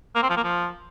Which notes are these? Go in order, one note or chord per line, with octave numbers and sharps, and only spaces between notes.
A#3
C4
F3
A#3
F3